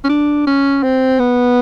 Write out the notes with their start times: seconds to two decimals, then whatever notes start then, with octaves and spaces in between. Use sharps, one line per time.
0.04 C#4
0.09 D4
0.47 C#4
0.83 C4
1.19 B3